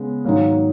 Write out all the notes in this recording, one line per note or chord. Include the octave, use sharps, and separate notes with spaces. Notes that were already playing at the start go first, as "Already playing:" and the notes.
Already playing: C#3 G#3 B3
G#2 D#3 F#3 A#3